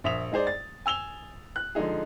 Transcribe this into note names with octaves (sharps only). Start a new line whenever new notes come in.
A#1 E5 D#6 F7
G#3 D#4 G#4 C5 D5
A6
G#5 E6 F7 G7
F#6
D3 F3 G#3 D#4 G#4